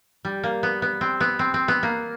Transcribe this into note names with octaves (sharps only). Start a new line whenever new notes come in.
G3
A#3
B3
B3
C4
B3
C4
C4
B3
A#3